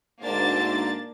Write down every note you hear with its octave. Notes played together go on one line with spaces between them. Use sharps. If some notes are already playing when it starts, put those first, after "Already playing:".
D2 G#2 A#3 D4 A6